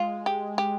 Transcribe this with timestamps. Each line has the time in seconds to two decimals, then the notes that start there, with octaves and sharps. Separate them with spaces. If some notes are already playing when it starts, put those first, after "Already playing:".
Already playing: G#3 F4
0.26 G4
0.58 G4